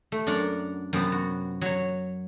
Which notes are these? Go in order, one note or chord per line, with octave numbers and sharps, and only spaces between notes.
A3
F#2 D4 A#4 F#5
F#2 C3 B3 A5
F#4
F#3 C#5